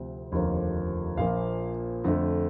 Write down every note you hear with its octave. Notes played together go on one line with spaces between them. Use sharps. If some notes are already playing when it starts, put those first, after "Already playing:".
Already playing: D2 C3 F3 C4
F1 D#2 D3 F3 A#3
A#1 A#2 F3 A#3 F5
F2 D3 A3